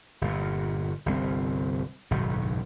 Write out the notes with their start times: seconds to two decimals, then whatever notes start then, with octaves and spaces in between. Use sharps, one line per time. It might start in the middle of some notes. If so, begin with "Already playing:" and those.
0.21 G1 A#2
1.06 G1 C2 C4
2.11 F#1 B1 G#2 D#3